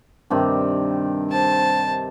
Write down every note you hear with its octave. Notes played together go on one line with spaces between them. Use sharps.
G2 C3 D#3
C5 A5